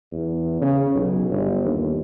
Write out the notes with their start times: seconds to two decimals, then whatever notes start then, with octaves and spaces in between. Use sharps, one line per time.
0.12 E2
0.61 C#3
0.95 B1
1.29 G1
1.65 D#2